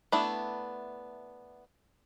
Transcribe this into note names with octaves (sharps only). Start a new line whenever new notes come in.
A3 B3 D4 E4